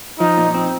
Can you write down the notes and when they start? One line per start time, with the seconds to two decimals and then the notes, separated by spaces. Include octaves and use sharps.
0.19 F3 D#4
0.37 A#2
0.54 C4